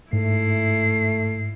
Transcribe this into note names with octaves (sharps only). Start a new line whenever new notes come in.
G#2 A3 E4 C7